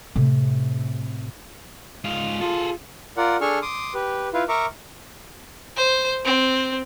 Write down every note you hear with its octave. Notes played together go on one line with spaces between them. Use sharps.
A2 C3
G#2 F4
F4 G#4 A4
F4 A#4 D5 F#5
D4 G#4 A4 C#6 F6
C6 D6 D#6
G4 B4
E4 F4 B4 F5
A#4 E5 A#5 C#6 D6
C5
C4